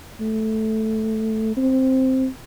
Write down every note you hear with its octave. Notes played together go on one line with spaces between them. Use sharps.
A3
C4